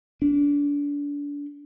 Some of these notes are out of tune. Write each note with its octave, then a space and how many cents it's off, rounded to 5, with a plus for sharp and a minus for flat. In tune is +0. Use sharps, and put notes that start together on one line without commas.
D4 -30